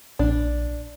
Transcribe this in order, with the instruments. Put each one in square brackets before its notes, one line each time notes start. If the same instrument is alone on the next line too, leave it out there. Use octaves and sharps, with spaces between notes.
[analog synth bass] A#1 [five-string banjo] D4